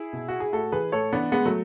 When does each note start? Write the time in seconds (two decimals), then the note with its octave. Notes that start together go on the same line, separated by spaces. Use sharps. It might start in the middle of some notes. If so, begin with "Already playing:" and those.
Already playing: E4 G#4
0.13 B2
0.28 F#4
0.40 G#4
0.53 A2 F#4 A4
0.72 E3 G#4 B4
0.92 A2 A4 C#5
1.13 E3 B3 D4
1.32 A2 G#3 B3
1.45 F#3 A3